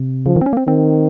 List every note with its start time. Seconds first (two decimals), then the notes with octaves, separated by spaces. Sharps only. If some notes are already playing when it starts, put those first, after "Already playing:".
Already playing: C3
0.26 C#3 F3
0.36 D#3
0.41 C4
0.46 C#4
0.53 A#3
0.57 C4
0.67 D#3 C4